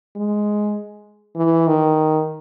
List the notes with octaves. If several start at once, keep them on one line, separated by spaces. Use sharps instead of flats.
G#3
E3
D#3